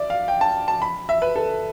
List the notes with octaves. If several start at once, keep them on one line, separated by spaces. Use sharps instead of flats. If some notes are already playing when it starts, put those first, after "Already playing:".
Already playing: D5 E5
F5
G5
A5
A5
B5
E5
B4
A4